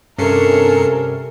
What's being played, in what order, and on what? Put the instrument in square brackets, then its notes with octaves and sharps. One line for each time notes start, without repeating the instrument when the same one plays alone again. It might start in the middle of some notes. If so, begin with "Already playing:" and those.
[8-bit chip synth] G2 C7 C#7 [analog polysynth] C3 C#4 [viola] A4 [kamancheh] A#4